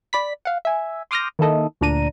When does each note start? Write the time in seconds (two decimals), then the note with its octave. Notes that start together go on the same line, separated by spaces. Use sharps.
0.13 D5 B5 B6
0.45 F5 F#5
0.65 E5 G#5
1.11 C6 D6 D#6 F6 G6 A#6
1.39 D#3 A#3 E4 A4 D#5
1.81 D2 A#2 D4 A#5 D#7